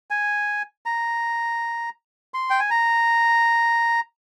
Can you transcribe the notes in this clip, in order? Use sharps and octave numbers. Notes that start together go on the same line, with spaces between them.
G#5
A#5
C6
G5
G#5
A#5